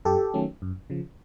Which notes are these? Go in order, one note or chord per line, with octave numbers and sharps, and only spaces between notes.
F#2 G4 A4
D#3 F#3 A3 C#4
F#2
C#3 F3